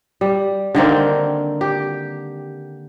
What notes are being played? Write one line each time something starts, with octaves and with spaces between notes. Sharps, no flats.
G3
D3 D#3 A#3 C4
G4